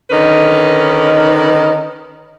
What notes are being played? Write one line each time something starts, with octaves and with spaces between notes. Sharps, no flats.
D3 D#3 C#4 D#4 A#4 B4